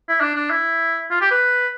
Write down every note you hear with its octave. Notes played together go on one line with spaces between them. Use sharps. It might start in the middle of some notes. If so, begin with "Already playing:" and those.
E4
D4
D4
E4
F4
G4
B4